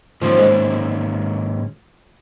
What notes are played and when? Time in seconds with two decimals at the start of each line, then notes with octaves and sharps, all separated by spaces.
0.21 G#2 D#3 F3 A#3 C#4
0.39 G#3